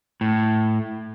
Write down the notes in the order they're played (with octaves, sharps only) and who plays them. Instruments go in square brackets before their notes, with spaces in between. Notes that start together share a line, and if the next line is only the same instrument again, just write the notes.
[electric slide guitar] A2